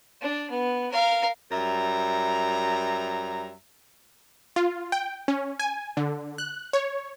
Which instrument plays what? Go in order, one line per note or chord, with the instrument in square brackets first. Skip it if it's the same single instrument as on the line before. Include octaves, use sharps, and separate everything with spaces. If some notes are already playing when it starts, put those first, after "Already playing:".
[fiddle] D4
B3
A#4 F5
[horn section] F#2 G3 E5 A#5
[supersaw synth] F4
G5
C#4
G#5
D3
F#6
C#5